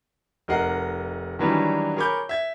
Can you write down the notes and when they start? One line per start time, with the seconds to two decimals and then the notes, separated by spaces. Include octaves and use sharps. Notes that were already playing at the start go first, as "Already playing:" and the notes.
0.48 F1 D#4 A#4 D#5 F#5 C7
1.39 D#3 E3 F#3 G3 C#4 D4
1.97 G#4 A#4 C#5 B5 D6 G6
2.29 E5 G#6